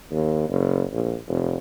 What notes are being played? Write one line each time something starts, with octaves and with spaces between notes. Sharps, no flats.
D#2
F#1
A#1
F1